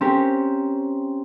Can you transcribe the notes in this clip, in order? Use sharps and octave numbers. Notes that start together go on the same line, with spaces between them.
C4 C#4 G4 A#4 C#5 C6